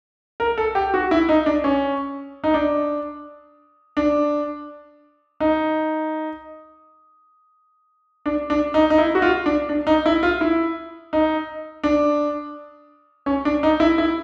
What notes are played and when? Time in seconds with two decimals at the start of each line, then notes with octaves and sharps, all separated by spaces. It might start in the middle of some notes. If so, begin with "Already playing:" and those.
0.40 A#4
0.58 A4
0.75 G4
0.94 F#4
1.11 E4
1.29 D#4
1.46 D4
1.64 C#4
2.44 D#4
2.54 D4
3.97 D4
5.40 D#4
8.26 D4
8.50 D4
8.74 D#4
8.90 D#4
8.98 E4
9.15 F#4
9.22 F4
9.46 D4
9.69 D4
9.87 D#4
10.06 E4
10.23 F4
10.41 E4
11.13 D#4
11.84 D4
13.26 C#4
13.45 D4
13.63 D#4
13.80 E4
13.98 E4